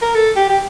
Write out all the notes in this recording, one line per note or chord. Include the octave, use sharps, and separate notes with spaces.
A#4
A4
G4
G4